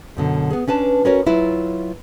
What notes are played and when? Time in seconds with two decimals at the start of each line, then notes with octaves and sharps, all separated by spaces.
0.17 F#2 B2 D3
0.50 B3 G#4
0.68 C#4 D4 B4 A5
1.05 C#4 F#4 A#4 B4 C#5
1.26 F#3 E4 F4 B4